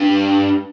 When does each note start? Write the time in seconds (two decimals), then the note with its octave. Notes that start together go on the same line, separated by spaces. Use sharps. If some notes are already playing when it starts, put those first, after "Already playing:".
Already playing: G2